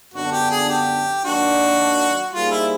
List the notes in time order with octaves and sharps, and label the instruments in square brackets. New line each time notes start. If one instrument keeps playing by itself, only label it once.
[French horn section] F#2 D3 F#3 B3 D4 [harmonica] F#4
[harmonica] G4
G#4
G4
[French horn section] D#3 F#3 A#3 D4 [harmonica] F#4
[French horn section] G3 A#3 D#4 G#4 C5 [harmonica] F4
[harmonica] E4